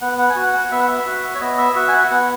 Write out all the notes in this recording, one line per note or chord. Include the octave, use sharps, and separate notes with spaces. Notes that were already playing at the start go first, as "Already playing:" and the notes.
B3 F#5
F#5
G#5
F#4 F#5
F#5
B3 E5
F#5
E5
F#4
C#5
B3 D#5
E5
F#4 E5
G#5
F#5
B3 F#5